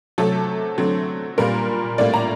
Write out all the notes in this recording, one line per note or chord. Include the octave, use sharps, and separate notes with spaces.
C3 F#3 A3 A4
D3 F#3 A3 C4
A#2 G3 A#3 A#4
A2 G3 A#3 D5
A#5